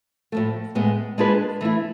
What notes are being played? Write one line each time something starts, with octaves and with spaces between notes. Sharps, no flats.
A2 F3 A3
A2 G#3 B3
G#3 D4 F4 G#4 B4
E3 A3 E4